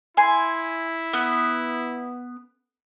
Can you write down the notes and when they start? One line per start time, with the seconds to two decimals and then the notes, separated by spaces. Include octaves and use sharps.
0.17 E4 G#5 C6
1.13 B3